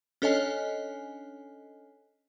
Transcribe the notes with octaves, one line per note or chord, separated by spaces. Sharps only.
C#4 D4 A4 C#5 D#5 G#5